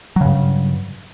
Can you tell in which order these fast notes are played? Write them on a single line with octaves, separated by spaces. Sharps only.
F#3 C#3 G2